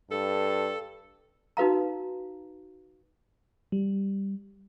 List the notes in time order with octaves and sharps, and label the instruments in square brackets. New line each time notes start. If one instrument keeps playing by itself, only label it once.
[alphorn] G2 [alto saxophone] A4
[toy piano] D#4 F#4 B4 F5 A#5
[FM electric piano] G3